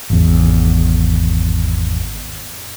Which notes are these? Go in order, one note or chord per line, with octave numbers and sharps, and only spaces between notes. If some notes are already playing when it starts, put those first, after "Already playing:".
G#1 E2